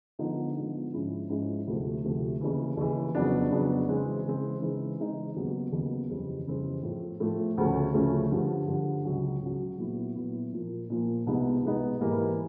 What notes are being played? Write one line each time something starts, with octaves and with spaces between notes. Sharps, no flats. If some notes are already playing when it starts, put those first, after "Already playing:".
D3 F3 G#3 B3 D#4
D3 F3 G#3 B3 D#4
G#2 F3 G#3 C#4 E4
G#2 F3 G#3 C#4 E4
D2 C3 F3 A3
D2 C3 F3 A3
D#2 C#3 E3
D#2 C#3 E3
F2 C#3 F#3 B3 D4
F2 C#3 F#3 B3 D4
C#3 E3 G#3 C4
C#3 E3 G#3 C4
C#3 E3 G#3 C4 D#4
C#3 E3 G#3 C4 D#4
D#2 C#3 F#3 B3
D#2 C#3 F#3 B3
F2 C#3 E3 G3 C4
F2 C#3 E3 G3 C4
A2 F3 A3
A2 F3 A3
D2 C#3 F3 A3 C#4
D2 C#3 F3 A3 C#4
G2 D3 F3
G2 D3 F3
C#2 C#3 F#3
C#2 C#3 F#3
A#2 F#3 B3 E4
A#2 F#3 B3 E4
A#2 F3 A#3
A#2 F3 A#3
C2 B2 G#3 B3 D#4
C2 B2 G#3 B3 D#4
G#2 E3 G3 A#3